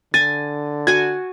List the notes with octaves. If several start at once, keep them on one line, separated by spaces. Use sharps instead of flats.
D3 G#5 A6
F#4 G#5 G#6